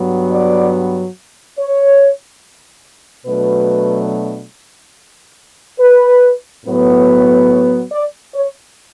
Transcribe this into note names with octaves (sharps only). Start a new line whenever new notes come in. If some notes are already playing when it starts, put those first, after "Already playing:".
Already playing: G2 F#3 B3
D5
C#5
B2 F#3 A3 D4 B4
B4
A2 F#3 B3
C#5
D5
C#5